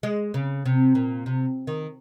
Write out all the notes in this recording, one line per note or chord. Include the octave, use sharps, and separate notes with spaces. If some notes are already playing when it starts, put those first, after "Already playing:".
G#3
C#3
C3
A#2
C3
D#3